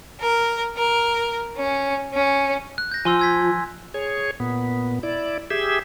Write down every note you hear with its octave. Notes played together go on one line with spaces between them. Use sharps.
A#4
A#4
C#4
C#4
F#6
G6 A#6
F3 G#5 C6 E6
E6 G#6 B6
G#4 C#5
A#2 B3
E4 D5
G4 G#4 E5